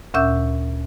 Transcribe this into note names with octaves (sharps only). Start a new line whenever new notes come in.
D2 A#2 C#4 E5 E6 G6